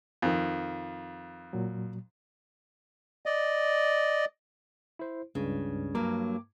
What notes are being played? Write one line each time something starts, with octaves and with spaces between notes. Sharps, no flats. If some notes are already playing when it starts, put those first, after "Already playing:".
F2 D#3
A#2 F#3
D5 D#5
E4 C5
C#2 G2 C#3
G2 F#3 A#3 D6